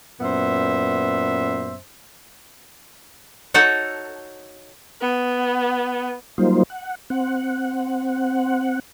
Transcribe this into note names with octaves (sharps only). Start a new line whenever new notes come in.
F#2 A#2 B3 C5 E5
D#4 F#4 A4 C#5 F#5
B3
F#3 G3 A#3 D#4 F4 C5
F#5
C4 F#5